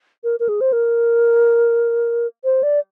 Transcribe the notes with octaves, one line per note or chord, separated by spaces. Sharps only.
A#4
A#4
G#4
C5
A#4
C5
D5